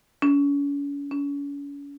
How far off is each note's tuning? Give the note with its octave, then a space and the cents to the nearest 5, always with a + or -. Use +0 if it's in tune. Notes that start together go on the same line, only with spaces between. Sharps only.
C#4 +40
C#4 +40